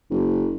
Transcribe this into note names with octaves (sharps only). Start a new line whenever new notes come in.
F#1